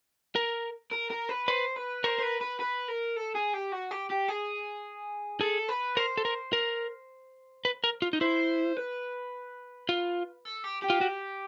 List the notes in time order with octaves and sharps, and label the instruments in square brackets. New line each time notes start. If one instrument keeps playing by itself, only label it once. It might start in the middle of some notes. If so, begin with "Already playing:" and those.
[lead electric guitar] A#4
[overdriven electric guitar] A#4
A#4
B4
[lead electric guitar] B4 [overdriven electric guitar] C5
[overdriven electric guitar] B4
[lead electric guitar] A#4 [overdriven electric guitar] C5
[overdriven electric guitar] C5
B4
B4
B4
A#4
A4
G#4
G4
F#4
G4
G4
G#4
[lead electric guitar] G#4 [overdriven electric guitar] A4
[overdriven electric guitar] B4
[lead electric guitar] A#4 [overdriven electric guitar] C5
[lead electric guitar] A4
A#4
A#4
B4
A#4
F4
D#4
[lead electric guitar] E4 [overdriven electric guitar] C5
[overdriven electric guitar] B4
[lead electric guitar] F4
[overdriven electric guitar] A4
G4
G4
[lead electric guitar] F4
F#4